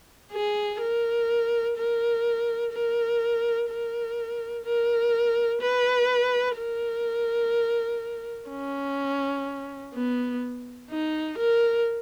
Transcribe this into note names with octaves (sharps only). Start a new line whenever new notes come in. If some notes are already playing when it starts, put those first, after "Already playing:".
G#4
A#4
A#4
A#4
A#4
A#4
B4
A#4
C#4
B3
D#4
A#4